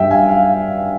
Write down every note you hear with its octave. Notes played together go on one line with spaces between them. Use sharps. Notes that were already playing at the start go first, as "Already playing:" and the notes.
Already playing: G2 G3 E5 G5
F5 G#5
F5